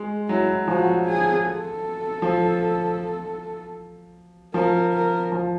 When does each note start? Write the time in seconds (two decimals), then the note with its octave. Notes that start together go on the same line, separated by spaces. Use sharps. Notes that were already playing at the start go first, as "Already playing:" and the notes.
Already playing: G#3
0.29 F#3 E4
0.68 F3 F#4
1.06 G#4
1.45 A4
2.22 F3
4.54 F3 A#4
4.94 A#4
5.32 F3